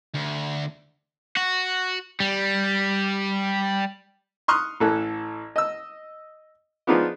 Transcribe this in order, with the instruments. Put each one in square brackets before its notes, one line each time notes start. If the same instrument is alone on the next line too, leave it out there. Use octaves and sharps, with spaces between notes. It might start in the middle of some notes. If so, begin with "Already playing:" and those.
[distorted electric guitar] D2
[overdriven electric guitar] F#4
G3
[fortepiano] C6 C#6 D#6 F6 F#6
A1 E3 A4 F#6
D#5 E6
F3 B3 D4 D#4 F4 G#4